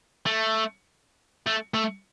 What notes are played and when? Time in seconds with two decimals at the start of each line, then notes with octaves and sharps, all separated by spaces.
0.26 A3
1.47 A3
1.74 A3